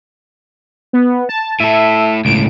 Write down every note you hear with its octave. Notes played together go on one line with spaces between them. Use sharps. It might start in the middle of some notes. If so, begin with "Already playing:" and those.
B3
A5
A2 A4 E5
C#2 A2 D7